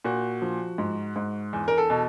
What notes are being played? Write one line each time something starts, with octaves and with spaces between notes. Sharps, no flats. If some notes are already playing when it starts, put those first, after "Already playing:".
A#2 F#4
F3
G#2
G#2
E2
A#4
A4
B2